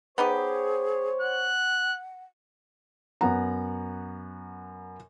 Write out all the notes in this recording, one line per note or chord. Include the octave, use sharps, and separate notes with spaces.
B3 D#4 G4 G#4 C5 C#5
F#5 F#6
F#2 B3 F#5 A#5